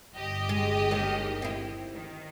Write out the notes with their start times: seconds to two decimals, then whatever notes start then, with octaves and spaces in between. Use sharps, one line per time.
0.15 G1 G4 D#5
0.49 G#3
0.91 D#2 D#3 G#3
1.42 C4 E4
1.94 D#3